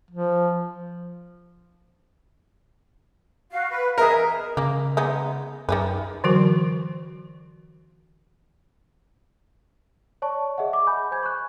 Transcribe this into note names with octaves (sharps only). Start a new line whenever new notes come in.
F3
F#4 F5
B4
G#4 A#4 D#5 E5
C#3 G#3 A#3
G#3 B3 D#4
F#2 D#3 G#4 B4
D3 E3 F#3 F#4 A#4
C#5 D5 A5 C#6
G#4 D#5 E5 F#5
D6
G#5 B5 G6
C5 G#5 G6 G#6
C#6 F#6